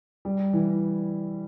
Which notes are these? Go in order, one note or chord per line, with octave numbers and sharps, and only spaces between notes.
G3
E3